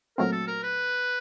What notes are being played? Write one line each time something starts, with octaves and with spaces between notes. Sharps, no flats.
A#2 F#3 A3 C4 A#4
A4
A#4
B4